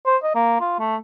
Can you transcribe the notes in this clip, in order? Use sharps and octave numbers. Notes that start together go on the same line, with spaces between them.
C5
D#5
A#3
F4
A3